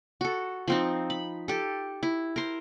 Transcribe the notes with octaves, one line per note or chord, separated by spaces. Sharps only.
F#4 A4
F3 C4 D#4
B5
G4 A4
E4
A#4 C5